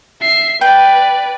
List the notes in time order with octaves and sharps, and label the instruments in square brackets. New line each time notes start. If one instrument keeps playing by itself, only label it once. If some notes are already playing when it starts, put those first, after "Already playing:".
[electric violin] E5 C7
[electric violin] B4 D5 [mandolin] G5